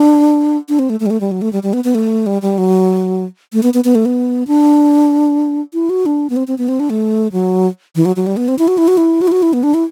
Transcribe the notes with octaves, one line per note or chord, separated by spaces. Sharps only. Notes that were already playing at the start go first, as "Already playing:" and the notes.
Already playing: D4
D4
C4
A3
A3
G3
A3
G3
F#3
A3
G3
G3
B3
B3
A3
G3
G3
F#3
A3
B3
B3
B3
A3
B3
D4
E4
F#4
D4
B3
C4
C4
B3
C4
D4
A3
F#3
E3
F#3
F#3
G3
B3
C4
E4
F#4
E4
F#4
E4
F#4
E4
F#4
E4
B3
D4
E4